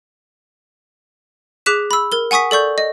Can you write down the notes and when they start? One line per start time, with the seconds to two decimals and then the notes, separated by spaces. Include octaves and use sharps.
1.66 G#4 D6 F#6 B6 E7
1.91 B5 E6
2.12 A#4 G7
2.31 F#5 G#5 C#6 D#6 B6
2.51 A4 D5 C#6 G6
2.78 D#5